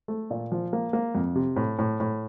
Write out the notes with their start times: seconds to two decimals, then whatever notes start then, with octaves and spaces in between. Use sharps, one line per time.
0.08 A3
0.31 A#2
0.52 F3
0.73 A#3
0.93 A#3
1.15 F2
1.35 C3
1.56 A2
1.78 A2
2.00 A2